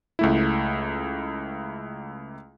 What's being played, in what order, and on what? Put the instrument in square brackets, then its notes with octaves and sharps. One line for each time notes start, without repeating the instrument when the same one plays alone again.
[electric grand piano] C#2 A3 E4